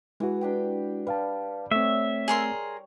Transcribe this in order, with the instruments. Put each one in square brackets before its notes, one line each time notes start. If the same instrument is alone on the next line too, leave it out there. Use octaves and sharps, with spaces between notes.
[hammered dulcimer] E3 [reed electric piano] G#3 E4 F#4
[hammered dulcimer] D4 G4 G5
[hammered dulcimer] G3 [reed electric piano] B4 F5 A5
[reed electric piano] A3 C4 [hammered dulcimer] C#5 [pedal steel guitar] E5
[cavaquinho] G#4 A#4 C6